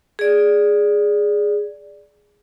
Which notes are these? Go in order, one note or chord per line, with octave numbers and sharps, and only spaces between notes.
G#4 D5